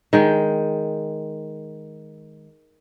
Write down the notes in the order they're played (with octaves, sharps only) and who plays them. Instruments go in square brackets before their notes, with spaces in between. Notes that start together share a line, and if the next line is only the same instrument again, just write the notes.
[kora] D#3 G#3 G5